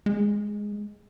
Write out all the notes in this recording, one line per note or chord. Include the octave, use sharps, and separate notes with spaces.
G#3